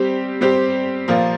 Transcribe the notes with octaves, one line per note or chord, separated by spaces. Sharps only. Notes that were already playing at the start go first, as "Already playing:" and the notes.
Already playing: G3 C4 G4
G3 C4 G4
A#2 F3 A#3 F4